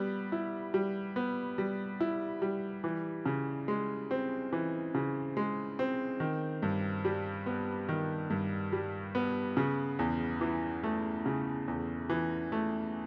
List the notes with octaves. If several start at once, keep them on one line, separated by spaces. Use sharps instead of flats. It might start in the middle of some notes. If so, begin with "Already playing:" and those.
Already playing: G3 B3
E4
G3
B3
G3
E4
G3
E3
C#3
G#3
C4
E3
C#3
G#3
C4
D#3
G2
G3
B3
D#3
G2
G3
B3
C#3
E2
E3
A3
C#3
E2
E3
A3